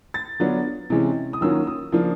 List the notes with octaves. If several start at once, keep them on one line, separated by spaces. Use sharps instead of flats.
A6
D3 F#3 B3 D4 F4
C3 E3 G#3 C#4
D#6
D#3 F#3 A#3 C#4 F4 E6
D#6
C#3 F3 A#3 D4 F4